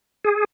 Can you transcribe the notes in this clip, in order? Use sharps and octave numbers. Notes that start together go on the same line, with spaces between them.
G#4